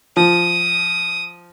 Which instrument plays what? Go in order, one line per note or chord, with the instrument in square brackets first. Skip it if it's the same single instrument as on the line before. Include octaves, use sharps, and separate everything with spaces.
[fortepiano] F3 [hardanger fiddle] D#6